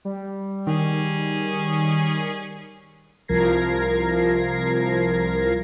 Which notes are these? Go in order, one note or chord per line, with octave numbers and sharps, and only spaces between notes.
G3
D#3 C#4 G#4
C2 F3 A#4 G#6 A#6 C7